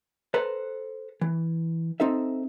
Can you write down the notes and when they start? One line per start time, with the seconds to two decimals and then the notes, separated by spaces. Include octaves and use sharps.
0.34 A4 B4 C5 A#5
1.21 E3
2.00 C4 D#4 A4 E5